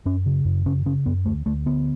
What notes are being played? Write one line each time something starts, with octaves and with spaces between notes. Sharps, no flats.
F#2 C#4
C#3
F#2
C#3 C#4
C#3 C#4
F#2 B3
D2 A3
D2 A3
D3 B3